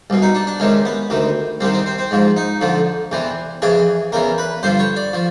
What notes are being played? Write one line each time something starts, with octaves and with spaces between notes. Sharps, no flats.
C2 B2
D#4
D4
D4
C#2 C3 D#3 C#4
B3
D2 C3 D#3
C2 C3 D#3 C4
C4
C4
C4
G#2 F3
D#4
F2 D3 F3
E2 C3 E3
F2 C#3 E3 G#4
E2 C#3 E3 A#4
B4
G2 D3 F3 C5
C#5
D5
F3